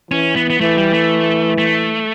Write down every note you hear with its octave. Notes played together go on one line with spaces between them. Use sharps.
E3 C#4
B3
B3
E3 A3
G3
A3
A3